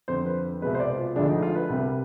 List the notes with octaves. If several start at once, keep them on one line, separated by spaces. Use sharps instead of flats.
F2 D3 F3 C5
B4
C2 B2 G#3 B4
C5
D5
F4
D2 D3 F3 G#3 D4
D#4
F4
B4
C2 C3 G3